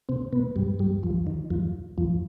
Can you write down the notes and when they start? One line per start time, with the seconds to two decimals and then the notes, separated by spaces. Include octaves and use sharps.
0.09 C3 C4
0.33 B2 B3
0.56 G2 G3
0.79 G2 G3
1.03 F2 F3
1.27 D#3
1.50 F2 F3
1.98 F2 F3